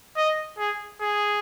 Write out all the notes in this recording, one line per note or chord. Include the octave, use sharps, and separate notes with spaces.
D#5
G#4
G#4